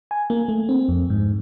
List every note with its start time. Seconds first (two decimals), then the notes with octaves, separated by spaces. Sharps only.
0.11 G#5
0.30 A#3
0.49 A3
0.69 C4
0.89 F2
1.10 G#2